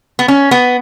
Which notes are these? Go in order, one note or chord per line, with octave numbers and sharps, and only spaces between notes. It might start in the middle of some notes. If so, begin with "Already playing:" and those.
B3
C#4
B3